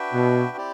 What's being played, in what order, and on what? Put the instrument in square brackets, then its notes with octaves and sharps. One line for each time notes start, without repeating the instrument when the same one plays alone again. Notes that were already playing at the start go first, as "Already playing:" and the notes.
Already playing: [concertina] D4 F#4 B4 E5 G5
[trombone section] B2
[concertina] C4 E4 G4 D5